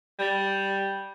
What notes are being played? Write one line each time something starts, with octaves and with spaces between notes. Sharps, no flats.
G3